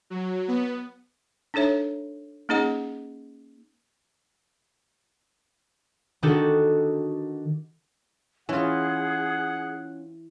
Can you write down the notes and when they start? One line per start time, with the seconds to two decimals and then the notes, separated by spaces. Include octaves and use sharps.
0.10 F#3
0.48 B3
1.54 D4 D#4 A4 C#5 E5
2.49 A#3 C#4 D#4 G#4 D#5 F#5
6.23 D#3 D4 D#4 F#4 G4 A4
8.49 E3 C#4 F4 G#4 F#5